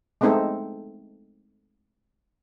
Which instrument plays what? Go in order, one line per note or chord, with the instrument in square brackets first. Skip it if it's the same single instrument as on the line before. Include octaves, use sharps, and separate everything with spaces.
[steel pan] G#3 A3 B3 C4 D#4 A4